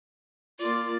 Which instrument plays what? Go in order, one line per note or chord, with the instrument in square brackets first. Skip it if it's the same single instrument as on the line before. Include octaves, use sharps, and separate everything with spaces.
[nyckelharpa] A#3 D5 [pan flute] F4